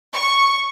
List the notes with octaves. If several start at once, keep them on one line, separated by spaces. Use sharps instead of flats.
C#6